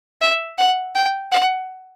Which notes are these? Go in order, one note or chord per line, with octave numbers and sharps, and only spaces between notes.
E5
F#5
G5
F#5